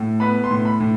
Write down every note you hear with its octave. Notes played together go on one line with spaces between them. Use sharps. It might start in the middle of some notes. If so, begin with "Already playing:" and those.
Already playing: A2
B3 B5
C6
A2
B5
A2